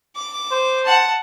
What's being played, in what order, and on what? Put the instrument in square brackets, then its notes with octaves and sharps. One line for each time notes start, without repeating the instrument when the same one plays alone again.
[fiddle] D6
[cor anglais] C5
[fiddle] F#5 A5